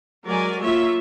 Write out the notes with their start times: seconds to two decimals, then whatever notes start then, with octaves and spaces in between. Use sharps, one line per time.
0.25 F#3 G#3 A#4 D5 G#5
0.62 A#3 F4 C#5 E5